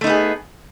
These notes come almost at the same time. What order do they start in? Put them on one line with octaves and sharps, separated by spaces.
A3 D#4 B3 G#4